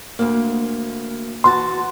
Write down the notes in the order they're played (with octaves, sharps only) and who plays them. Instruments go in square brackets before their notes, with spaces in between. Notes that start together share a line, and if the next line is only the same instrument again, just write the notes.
[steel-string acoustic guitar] D2 A#3
[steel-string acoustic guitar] E3 F#4 A5 [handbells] C6